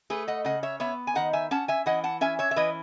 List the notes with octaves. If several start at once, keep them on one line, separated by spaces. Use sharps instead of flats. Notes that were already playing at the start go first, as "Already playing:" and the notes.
A3 G#4 B4
D#5 F#5
C#3 D#5 F#5
C#5 E5
B3 C#5 E5
G#5
D#3 D#5 F#5
E5 G#5
C#4 F#5 A5
E5 G#5
E3 D#5 F#5
F#5 A5
C#4 E5 G#5
C#5 E5
E5
E3 B4 D#5